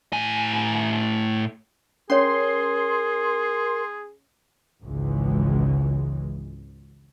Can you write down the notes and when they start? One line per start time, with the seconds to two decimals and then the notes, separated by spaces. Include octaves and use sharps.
0.13 A2 G#5
2.10 C#4 G#4 A#4 C#5 C6
4.81 G#1 C#2 C#3 E3 G#3